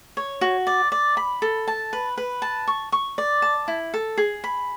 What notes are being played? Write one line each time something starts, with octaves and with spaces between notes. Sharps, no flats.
C#5
F#4
D5
D5
B5
A4
A5
B4
B4
A5
C#6
C#6
D5
A5
E4
A4
G#4
B5